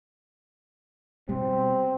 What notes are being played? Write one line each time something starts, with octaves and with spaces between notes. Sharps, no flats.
B2 G3 C4